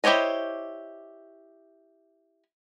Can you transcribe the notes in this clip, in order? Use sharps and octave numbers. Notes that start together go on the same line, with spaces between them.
E4 G4 C5 C#5 D#5